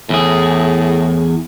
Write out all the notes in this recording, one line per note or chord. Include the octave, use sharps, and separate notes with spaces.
E2 A2 G#4